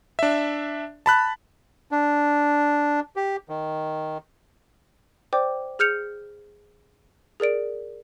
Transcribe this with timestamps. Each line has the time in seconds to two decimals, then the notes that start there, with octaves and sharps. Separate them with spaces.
0.19 D4 E5
1.06 A5 B5 F#6
1.91 D4
3.16 G4
3.49 D#3
5.33 C5 D5 G5 D6
5.79 G#4 F6 G6 C#7 F7
7.40 G#4 A#4 D5 D7